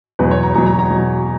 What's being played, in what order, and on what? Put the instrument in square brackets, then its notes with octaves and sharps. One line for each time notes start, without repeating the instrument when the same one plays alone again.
[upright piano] E2 B2 F#3 B4
C#5
A#5
E2 B2 F#3 A#5
A#5
A#5
B2 F#3